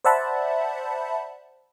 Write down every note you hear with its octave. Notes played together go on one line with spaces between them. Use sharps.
C5 D5 E5 F#5 A5 B5